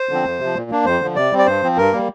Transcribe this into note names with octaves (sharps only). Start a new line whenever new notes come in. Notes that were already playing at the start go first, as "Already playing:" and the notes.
Already playing: C5
D3 F3 C4
F2
C3 F3
A#2
A#3 D4
F2 C5
D3 F3
C3 D5
G3 C4
D5
G2 C5
F3 C4
G2 A#4
G3 A#3